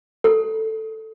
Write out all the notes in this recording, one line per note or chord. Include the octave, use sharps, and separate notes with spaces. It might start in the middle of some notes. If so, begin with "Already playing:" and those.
A4